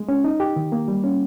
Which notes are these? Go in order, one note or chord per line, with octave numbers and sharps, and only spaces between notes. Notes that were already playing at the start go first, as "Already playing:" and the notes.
Already playing: G#3
C#4
D#4
G4
D#3
A#3
G3
C#4